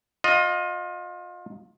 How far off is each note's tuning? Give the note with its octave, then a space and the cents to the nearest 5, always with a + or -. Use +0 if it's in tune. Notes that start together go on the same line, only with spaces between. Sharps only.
F4 +30 D#5 +0